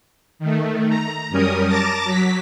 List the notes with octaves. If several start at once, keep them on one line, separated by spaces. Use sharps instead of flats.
D#3 A3
A#5
F#2 G3 C#4 A#4 D#6
A5 A#5 D6 A6 A#6
F#3 B6